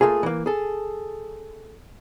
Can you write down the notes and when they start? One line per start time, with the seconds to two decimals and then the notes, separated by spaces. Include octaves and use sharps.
0.01 A3 A#3 F4 G#4
0.23 E3 A#3
0.46 G#4 A4